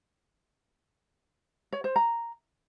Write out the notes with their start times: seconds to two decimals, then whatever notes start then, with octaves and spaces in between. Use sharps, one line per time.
1.73 C#5
1.84 C5
1.96 A#5